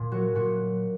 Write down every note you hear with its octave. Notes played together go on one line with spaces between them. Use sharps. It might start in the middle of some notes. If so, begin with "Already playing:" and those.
Already playing: A#2
F#3 F#4
A#2 F#4